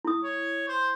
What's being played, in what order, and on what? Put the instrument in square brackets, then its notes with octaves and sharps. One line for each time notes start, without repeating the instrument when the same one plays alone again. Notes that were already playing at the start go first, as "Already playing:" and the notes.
[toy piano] E4 D#6
[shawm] C#5
C5